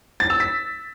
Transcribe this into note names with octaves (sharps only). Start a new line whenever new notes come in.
A6
E6
B6